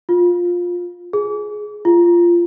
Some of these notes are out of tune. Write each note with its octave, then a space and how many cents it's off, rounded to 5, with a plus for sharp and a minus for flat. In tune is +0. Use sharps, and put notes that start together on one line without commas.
F4 +15
G#4 +15
F4 -15